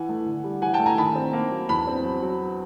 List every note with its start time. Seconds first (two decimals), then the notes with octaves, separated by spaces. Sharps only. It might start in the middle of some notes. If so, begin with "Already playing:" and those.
Already playing: E3 F#5 G#5
0.09 A3
0.26 D3
0.44 G3
0.62 E3 F#5 G#5
0.74 G5 A5
0.80 A3
0.86 G#5 A#5
0.98 D#3 A5 B5
1.16 C4
1.33 A#3
1.51 F#3
1.69 E2 A5 B5
1.87 C4
2.05 F#3
2.22 F#3